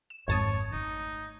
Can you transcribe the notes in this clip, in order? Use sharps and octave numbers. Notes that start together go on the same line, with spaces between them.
E7
G#1 F2 C#5 A5 D#6
A3 D#4